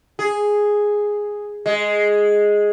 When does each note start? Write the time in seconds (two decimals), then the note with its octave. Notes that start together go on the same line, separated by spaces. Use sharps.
0.19 G#4
1.66 G#3